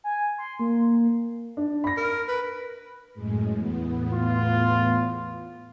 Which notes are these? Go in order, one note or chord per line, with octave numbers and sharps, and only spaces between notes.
G#5
C6
A#3
D4
B5 A#6
A#4
B4
F#2 A2 G#3
E2 A2 B3
F4